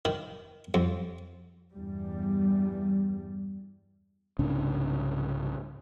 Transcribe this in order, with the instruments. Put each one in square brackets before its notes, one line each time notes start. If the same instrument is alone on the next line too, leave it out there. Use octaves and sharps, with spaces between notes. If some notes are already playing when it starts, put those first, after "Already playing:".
[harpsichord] D#3
F2
[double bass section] E2 G2 G3
[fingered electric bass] C2 G#2 C#3 D4